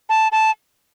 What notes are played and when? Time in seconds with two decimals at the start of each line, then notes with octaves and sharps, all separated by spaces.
0.09 A5
0.32 A5